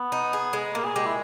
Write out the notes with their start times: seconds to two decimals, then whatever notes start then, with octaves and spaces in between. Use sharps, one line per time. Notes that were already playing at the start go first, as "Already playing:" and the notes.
Already playing: B3
0.12 D#4
0.33 G#4
0.53 G#3
0.74 A#2 A#3
0.85 G#4
0.96 G#3 G4
1.06 E4